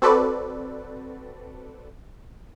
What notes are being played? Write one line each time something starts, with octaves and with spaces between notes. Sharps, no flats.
C4 F#4 A4 B4 D5